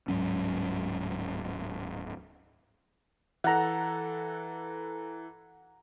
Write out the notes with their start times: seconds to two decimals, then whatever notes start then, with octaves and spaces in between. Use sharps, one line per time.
0.08 D1 G#2 F#3 C#4
3.44 E3 A4 F#5 A#5